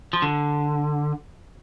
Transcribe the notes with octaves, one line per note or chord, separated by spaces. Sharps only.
F3
D3